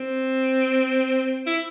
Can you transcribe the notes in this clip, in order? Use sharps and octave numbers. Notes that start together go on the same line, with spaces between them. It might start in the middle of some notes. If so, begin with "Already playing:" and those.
Already playing: C4
E4